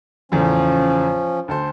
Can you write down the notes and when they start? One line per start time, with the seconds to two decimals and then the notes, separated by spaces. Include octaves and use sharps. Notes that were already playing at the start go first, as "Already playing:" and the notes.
0.32 E2 A2 C#3 F3 C#4
1.48 D2 A4 C5